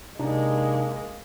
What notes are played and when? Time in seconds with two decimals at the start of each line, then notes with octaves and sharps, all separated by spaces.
0.20 C3 G#3 A#3 D4 D#4